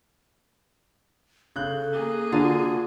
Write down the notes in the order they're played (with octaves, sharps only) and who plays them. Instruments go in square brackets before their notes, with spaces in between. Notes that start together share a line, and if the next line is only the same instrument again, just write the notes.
[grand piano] C#3 F#6 [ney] A4 [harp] G6
[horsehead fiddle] A#3 G#4
[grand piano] D3 D4 [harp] F4 [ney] F#4